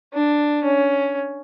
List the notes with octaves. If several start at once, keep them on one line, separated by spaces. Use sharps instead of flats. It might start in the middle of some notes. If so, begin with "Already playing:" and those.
D4
C#4